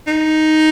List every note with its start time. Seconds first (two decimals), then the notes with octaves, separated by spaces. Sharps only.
0.07 D#4